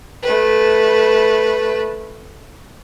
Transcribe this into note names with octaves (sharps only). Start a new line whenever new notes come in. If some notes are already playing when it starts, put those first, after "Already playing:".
A3 B4